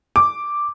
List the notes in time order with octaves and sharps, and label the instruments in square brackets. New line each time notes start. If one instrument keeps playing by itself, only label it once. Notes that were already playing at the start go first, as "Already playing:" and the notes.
[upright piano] D6